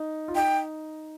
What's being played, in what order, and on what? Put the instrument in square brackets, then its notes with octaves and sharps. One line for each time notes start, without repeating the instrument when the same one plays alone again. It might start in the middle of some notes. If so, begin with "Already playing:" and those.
Already playing: [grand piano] D#4
F4
[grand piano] D#4 [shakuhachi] G5